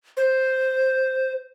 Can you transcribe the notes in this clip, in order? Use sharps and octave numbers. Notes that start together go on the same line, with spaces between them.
C5